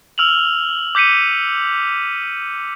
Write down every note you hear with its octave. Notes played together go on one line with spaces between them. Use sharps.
E6 F6 F7 F#7
D6 G6 B6 C#7 D#7